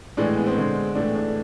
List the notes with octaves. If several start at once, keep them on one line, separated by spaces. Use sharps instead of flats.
A2 E3 G#3 D4
B3
C4
D3 G#3
A2 E3 A3 D4
D4